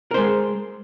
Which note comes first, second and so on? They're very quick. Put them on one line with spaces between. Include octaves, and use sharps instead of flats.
A#4 C5 G#3